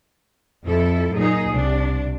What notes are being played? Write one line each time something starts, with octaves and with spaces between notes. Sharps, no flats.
F2 E4 A4
F#2 A#2 D#4 G#4
C2 C3 G3 D4